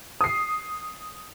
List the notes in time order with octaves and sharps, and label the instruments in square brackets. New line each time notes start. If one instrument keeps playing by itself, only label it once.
[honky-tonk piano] D#6 C7